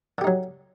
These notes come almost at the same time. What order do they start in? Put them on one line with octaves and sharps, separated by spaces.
D3 G4 D#4 F#3